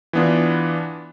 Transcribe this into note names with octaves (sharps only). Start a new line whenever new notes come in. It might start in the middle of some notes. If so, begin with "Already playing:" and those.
E3 B3 D4 F4